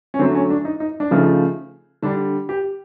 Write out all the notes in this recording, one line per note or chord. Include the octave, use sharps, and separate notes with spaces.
C#4
D3 F#3 A3 C4
C#4
D4
D#4
D#4
D4
C#3 F3 A3 D#4
D3 G3 D4
G4